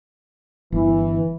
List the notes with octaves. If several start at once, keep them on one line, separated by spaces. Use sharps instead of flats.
G1 E3